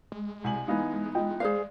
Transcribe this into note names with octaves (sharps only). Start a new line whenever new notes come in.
G#3
C2 G#5 F#7
E3 B3 D#4 F5 G#5
F4 D#5 G5
G#4 C5 D5 F5